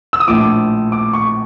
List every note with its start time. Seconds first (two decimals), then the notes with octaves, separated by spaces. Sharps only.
0.13 E6
0.20 D#6
0.27 A#1 A2 F3 D6
0.92 D6
1.13 C#6